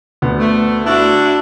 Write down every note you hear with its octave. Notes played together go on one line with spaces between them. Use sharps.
D2 B3
A3
D4 E4 F#4